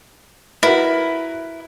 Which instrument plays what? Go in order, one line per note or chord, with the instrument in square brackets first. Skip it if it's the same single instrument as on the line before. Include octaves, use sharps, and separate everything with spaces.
[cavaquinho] E4 [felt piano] F#4 A#4 B4